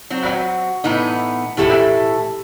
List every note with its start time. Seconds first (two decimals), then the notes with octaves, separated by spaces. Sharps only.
0.10 F#3 C4 F#4
0.84 A2 E3 B3 D#4
1.57 A2 E3 A3 E4 G4 A4